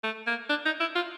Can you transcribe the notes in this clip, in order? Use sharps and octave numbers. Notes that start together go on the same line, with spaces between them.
A3
A#3
D4
D#4
E4
F4